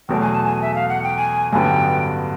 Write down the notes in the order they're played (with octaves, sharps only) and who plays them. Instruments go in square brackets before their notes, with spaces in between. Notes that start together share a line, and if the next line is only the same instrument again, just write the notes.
[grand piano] E2 B2 F#3 A3 [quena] G5
[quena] G#5
A5
G#5
E5
F5
F#5
G5
G#5
[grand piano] A1 G2 D3 F#3 B3 [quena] G5 G#5